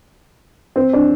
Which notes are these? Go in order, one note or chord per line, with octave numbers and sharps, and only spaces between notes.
C4
D4